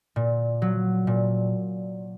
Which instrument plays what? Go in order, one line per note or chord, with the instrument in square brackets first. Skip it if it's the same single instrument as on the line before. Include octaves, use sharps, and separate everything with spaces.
[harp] A#2
F#3
A#2